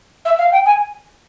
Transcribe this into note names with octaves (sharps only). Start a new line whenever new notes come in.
E5
F5
G5
G#5